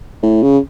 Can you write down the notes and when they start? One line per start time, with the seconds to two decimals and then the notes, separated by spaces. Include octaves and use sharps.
0.23 A2
0.43 C#3